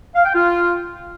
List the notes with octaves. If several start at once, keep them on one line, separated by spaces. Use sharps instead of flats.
F5
G5
F4